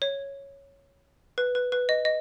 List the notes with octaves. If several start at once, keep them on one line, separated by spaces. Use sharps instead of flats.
C#5
B4
B4
B4
D#5
D#5